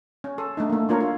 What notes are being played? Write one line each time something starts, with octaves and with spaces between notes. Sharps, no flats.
C#4
A4
A3 D4 D#4
A3 A#3
A#3 D4 F4 A#4 C#5
F4